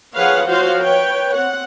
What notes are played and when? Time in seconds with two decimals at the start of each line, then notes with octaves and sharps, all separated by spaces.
0.15 F3 G#4 B4 C#5 F5 F#5
0.46 F3 F#4 C5 C#5 F5
0.80 B4 C#5 G5
1.35 C4 F#5